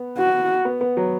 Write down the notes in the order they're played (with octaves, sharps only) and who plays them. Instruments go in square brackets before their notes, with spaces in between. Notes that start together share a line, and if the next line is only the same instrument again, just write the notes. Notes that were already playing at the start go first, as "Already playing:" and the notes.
Already playing: [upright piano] B3
[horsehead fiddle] F#4
[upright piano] B3
B3
F#3